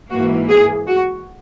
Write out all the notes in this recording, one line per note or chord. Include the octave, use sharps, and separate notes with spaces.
G#2 E3 A#3 F#4
G#4
F#4